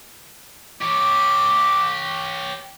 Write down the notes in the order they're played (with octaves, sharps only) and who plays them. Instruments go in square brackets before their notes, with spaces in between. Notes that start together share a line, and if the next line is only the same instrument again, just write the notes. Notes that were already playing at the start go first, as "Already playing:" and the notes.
[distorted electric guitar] G4 C#5 [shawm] D6